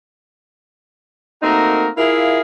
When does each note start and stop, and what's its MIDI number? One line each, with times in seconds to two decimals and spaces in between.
1.42 1.87 57
1.42 1.87 58
1.42 1.87 60
1.42 1.87 63
1.42 1.87 66
1.42 1.87 70
1.96 2.41 64
1.96 2.41 65
1.96 2.41 68
1.96 2.41 70
1.96 2.41 76
1.96 2.41 77